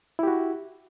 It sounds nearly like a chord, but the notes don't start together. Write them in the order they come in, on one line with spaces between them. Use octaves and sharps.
E4 G4 F#4